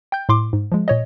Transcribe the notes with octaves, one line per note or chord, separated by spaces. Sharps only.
G5 G6
A2 C6 D6
G#2
F3 G#3
A#2 C#5 D#5